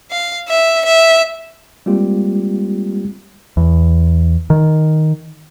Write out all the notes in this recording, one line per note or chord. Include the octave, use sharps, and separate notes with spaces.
F5
E5
E5
G3 G#3 A#3 C4 F4 G4
E2
D#3